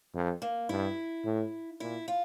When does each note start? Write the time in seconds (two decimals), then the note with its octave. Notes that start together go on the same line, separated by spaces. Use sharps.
0.14 F2
0.42 A#3
0.69 G2 E4
1.25 A2
1.80 A#2 E4
2.08 F4